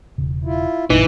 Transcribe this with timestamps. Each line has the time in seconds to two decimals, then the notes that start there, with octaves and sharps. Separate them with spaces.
0.18 E1 C#3
0.45 E4 F4
0.90 A1 F#2 A#2 E3 C4 D#4